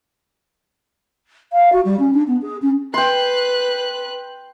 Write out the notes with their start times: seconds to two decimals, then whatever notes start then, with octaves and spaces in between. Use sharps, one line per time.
1.53 F5
1.72 F#4
1.85 G3
1.99 C#4
2.14 D4
2.27 B3
2.42 G#4
2.62 C#4
2.94 B4 G5 C6 F#6